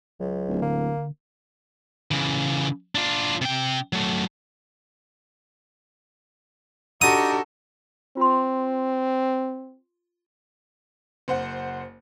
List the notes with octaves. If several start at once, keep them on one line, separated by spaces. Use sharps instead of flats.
C#2 F#3
D1
D3 A#3
C#3 E3
D4 F4
C3 G5
F#3 A3
D4 D#4 F#4 G4 A4 D#6
C4 F4 C6
F#1 C5 F#5